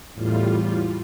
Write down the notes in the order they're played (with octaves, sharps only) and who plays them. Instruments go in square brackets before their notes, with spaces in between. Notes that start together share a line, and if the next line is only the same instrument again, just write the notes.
[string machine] E2 A2 G3 F4